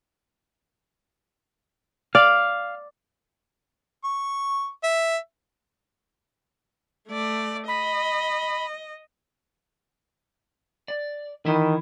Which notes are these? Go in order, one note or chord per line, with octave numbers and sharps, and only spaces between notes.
D5 F5
C#6
E5
A3 D5
D#5 B5
D5
D#3 E3 E4